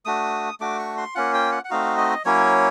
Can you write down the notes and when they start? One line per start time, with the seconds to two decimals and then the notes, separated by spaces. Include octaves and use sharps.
0.05 A3 D4 F#4 D#6
0.60 A3 D4 F#4 D6
0.79 C#6
0.98 C6
1.15 A#3 C#4 F4 F#5
1.34 G5
1.52 F#5
1.65 F#5
1.70 A3 C4 D#4 F#4 F5
1.98 D#5
2.25 F#3 A#3 C#4 E4 C#5